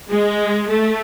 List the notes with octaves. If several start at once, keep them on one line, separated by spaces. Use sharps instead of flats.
G#3
A3